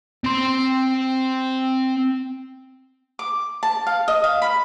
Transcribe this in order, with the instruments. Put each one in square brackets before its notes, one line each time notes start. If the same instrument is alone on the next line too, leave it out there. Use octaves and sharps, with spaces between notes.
[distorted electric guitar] C4 C6
[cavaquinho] D6
A5
F5
D#5
F5
B5